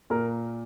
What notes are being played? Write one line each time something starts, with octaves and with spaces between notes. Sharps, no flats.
A#2 A#4